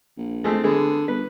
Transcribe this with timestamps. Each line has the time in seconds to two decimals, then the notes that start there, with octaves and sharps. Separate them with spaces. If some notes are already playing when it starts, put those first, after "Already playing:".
0.17 A#1
0.44 G#3 A3 C4
0.63 D3 G#3 B3 G#4
1.08 G1 B4